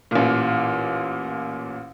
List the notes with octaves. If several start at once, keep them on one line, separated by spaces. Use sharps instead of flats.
A1 A#2